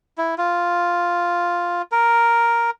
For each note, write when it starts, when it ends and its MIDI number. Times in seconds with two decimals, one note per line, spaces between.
0.18 0.35 64
0.38 1.82 65
1.92 2.70 70